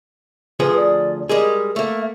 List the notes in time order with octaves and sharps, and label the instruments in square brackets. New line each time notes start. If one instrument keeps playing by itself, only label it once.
[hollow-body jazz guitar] D2 F3 G#4 [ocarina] B4
[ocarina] D5
[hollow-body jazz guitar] G3 G#3 G#4 [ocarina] A#4
[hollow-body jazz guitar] A3 A#3 [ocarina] E5